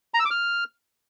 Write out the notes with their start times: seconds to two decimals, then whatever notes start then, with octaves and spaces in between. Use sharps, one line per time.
0.14 A#5
0.20 E6
0.25 D6
0.31 F6